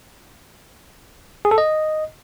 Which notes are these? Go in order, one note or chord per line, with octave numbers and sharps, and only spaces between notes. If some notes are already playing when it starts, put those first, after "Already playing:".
G#4
A4
D#5